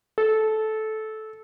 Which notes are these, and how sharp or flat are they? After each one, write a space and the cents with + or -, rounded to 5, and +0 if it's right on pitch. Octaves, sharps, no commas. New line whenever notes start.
A4 -15